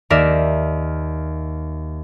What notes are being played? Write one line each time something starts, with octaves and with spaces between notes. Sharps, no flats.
D#2 A#4 D5 E5